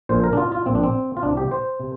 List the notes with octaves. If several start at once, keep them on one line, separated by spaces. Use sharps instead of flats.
A#1 A#2 C5
A#4
D4
F4
F4
A#1 A#2 C4
D4
C4
F4
C2 C3 D4
G4
C5
C3